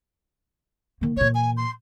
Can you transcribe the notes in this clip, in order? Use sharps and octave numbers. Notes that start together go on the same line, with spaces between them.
D#3 A#3
A#2 E3 C#5
G#5
C6